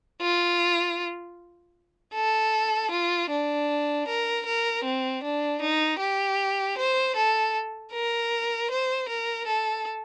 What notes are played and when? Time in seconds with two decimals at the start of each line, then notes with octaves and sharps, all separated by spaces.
0.22 F4
2.14 A4
2.91 F4
3.30 D4
4.07 A#4
4.46 A#4
4.84 C4
5.23 D4
5.61 D#4
6.00 G4
6.78 C5
7.16 A4
7.92 A#4
8.71 C5
9.09 A#4
9.47 A4